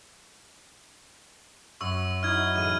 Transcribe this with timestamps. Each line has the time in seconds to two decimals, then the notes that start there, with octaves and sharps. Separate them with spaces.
1.81 F#2 C#6 E6
2.23 D#4 E4 F#4 F6 G#6
2.56 A1 G#4 F6 D#7